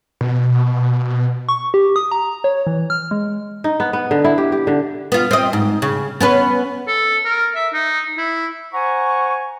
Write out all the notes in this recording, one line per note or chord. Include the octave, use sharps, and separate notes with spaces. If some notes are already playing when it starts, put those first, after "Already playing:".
B2
C#6
G4
D#6
A#5
C#5
E3
F6
G#3
D#4
B3
B3
D3
E4
G4
G4
D3
B3 F4
C4 D#5
G#2
C#3
B3 C#4 B4
A4
A#4
E5
D#4
E4
C5 F#5 G#5 A#5 C#6